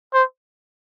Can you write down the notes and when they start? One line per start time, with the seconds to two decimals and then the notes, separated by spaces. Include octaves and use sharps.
0.14 C5